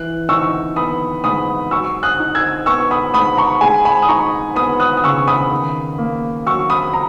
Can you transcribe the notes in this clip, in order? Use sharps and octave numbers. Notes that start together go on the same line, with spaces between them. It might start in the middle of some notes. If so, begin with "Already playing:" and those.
Already playing: E3 F#6
D#4 C#6 E6
B3 B5 D#6
G#2 B5 D#6
F#3 C#6 E6
D#6 F#6
D#4
E6 G#6
B3 C#6 E6
B5 D#6
G#2 B5 D#6
A#5 C#6
G#3 G#5 B5
G#5 B5
D#6
D#4 A#5 C#6
B3 B5 D#6
D#6 F#6
D#6
C#3 C#6 E6
B5 D#6
D#3
A#3
F#3 C#6 E6
B5 D#6
A#5